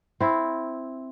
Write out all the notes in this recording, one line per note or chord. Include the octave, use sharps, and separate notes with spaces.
C4 E4